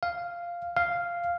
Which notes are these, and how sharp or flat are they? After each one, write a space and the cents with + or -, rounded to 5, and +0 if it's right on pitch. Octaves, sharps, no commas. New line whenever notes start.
F5 -5
F5 -5